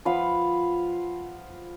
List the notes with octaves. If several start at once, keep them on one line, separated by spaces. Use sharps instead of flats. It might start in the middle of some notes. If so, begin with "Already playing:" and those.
F3 B4 F5 F#5